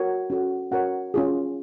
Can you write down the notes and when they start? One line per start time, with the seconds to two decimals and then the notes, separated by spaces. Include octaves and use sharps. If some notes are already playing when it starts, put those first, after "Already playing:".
Already playing: F#4 A#4 C#5
0.30 C#4 F#4 A4
0.72 C#4 F#4 A#4 C#5 F#5
1.14 C#4 F4 G#4